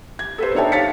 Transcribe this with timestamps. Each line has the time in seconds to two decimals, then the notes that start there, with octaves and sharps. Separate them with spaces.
0.19 G#6
0.38 A4 B4 C5
0.55 D4 D#4 C#5 E5 G5 A5
0.72 F5 A6 B6 C#7